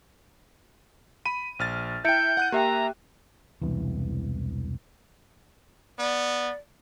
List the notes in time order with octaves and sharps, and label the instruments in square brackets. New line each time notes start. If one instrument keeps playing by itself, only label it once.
[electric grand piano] B5 D#7
A#1 F6 A6
[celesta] E4 C#7 D7 [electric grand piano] E5 G5 [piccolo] G6
[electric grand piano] F#5 F#6 D#7
[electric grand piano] A#3 E5 [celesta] G4 G5 [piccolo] A#5
[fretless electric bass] E1 C2 E3
[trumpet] B3 [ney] D5